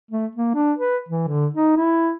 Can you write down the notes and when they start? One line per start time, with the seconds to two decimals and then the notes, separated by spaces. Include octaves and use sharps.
0.11 A3
0.35 A#3
0.54 D4
0.78 B4
1.08 E3
1.28 D3
1.54 D#4
1.77 E4